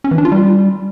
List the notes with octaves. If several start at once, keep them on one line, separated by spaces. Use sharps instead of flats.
C#4
E3
D4
F4
G3